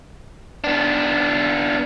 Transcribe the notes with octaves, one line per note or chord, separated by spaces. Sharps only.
B3 D4